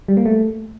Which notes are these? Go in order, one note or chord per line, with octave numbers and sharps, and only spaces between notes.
G3
A#3
A3